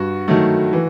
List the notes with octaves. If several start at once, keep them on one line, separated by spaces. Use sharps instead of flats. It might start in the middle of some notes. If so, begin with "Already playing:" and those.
Already playing: G2 F#4
D#3 F#3 A3
E3